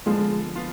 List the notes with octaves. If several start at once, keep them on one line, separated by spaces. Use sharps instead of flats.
D3 F3 G#3 B3 F4
B3 F4